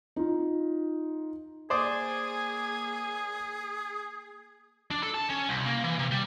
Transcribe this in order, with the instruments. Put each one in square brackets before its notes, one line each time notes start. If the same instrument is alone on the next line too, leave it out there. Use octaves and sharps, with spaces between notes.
[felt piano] D#4 F4
[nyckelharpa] A#3 G#5 [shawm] G#4 [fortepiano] C5 D5 D#6
[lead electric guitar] D4
A4
A5
C#4
C2
A#3
E3
C3
G3